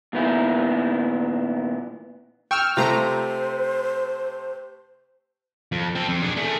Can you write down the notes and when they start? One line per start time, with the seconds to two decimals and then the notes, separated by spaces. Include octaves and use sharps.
0.13 A#2 D#3 B3 E4
2.51 G5 C#6 E6 F6
2.77 C3 A3 F4 C5 A#5
5.72 F2
5.95 C4 A4
6.09 F2
6.22 D4 G#4
6.37 A3 G#4